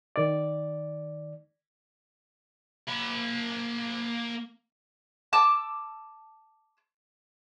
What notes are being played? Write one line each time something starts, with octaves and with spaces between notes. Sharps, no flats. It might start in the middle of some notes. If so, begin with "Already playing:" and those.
D#3 D5
A#3 B5
A5 D6 E6